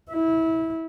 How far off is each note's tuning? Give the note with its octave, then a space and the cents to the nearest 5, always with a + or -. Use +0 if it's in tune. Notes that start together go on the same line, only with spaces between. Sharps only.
E4 -25